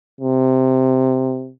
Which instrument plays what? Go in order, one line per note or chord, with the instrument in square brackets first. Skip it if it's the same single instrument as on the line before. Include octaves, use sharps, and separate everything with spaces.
[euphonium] C3